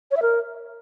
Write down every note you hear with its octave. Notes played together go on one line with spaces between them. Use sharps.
C#5
E5
A#4